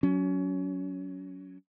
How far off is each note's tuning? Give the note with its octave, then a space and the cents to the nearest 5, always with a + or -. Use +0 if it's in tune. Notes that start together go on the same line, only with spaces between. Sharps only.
F#3 +0 C#4 +25